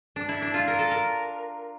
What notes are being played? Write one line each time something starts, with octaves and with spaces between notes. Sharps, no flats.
D4
E4
D4
F4
A#4
A4
A#4